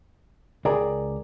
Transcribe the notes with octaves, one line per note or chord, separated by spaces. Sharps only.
C#2 G#4 A#4 D5 G5 A#5